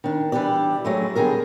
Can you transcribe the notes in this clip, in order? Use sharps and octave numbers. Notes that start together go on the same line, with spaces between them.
D#3 D4
E3 G3 D4 G4 D5
F#3 G#3 A3
E2 D3 G3 G#4 A#4